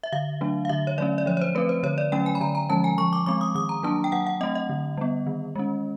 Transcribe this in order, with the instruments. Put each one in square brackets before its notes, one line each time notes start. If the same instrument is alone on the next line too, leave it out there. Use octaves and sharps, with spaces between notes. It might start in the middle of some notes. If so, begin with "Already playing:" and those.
[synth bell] E5
D3 F5
F#3 A3 D4
F5
D3 E5
C#5
F#3 A3 C#4 D5
D5
F3 C#5
C#5
C5
A3 C4 B4
C5
D3 C#5
D5
F#3 A3 C#4 G5
G#5
B5
D3 A#5
A#5
F3 G#3 C#4 A5
G#5
F3 C#6
D6
G#3 C4 D6
D#6
D#3 D#6
A#5
F#3 A#3 D4 A5
G5
F#3 F#5
F#5
A3 C4 D#5
D#5
D3
G3 B3
D#3
G#3 C#4